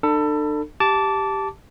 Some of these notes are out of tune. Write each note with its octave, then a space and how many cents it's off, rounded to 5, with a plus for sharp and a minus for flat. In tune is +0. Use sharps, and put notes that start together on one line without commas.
D4 +40 A4 +25 B5 -10
G4 +0 A5 +0 D6 -20